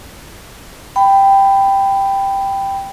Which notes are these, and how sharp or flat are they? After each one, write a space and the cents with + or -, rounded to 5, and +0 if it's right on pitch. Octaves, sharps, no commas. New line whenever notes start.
G5 +0 B5 +20